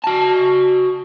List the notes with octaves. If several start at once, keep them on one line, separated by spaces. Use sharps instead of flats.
F#4 A5